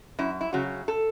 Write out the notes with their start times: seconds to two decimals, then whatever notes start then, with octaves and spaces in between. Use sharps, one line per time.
0.19 F#2 E4
0.41 E4
0.53 C#3 F#3 F#4
0.88 A4